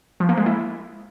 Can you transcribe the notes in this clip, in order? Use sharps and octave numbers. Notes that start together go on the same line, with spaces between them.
F3
A#3
G#3
E4